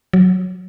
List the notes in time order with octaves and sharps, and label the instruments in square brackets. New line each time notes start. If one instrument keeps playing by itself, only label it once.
[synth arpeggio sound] F#3